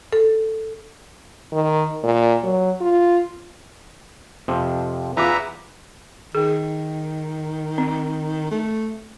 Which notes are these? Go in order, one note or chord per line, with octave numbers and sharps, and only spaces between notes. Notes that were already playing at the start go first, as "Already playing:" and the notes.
A4
D#3
A#2
F#3
F4
F2 C3 F3
E2 F4 B4 E5 A#5 D6
D#3 G#4
C4
A3